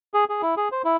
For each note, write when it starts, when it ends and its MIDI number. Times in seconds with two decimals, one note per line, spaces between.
0.14 0.24 68
0.29 0.42 68
0.42 0.55 64
0.57 0.68 68
0.72 0.82 72
0.84 0.97 64